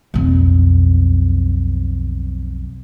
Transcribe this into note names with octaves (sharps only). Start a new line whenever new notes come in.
B1 F2